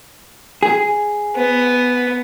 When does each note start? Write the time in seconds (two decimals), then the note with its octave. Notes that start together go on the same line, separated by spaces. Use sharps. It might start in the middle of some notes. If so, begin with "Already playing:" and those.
0.63 G#4
1.36 B3